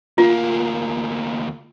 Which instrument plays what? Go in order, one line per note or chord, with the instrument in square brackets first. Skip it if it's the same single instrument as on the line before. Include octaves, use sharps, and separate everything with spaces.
[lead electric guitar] D2 A#3 [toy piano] F4